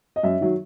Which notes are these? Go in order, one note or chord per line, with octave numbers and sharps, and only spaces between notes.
D#5
F#2 E5
D#3 F#3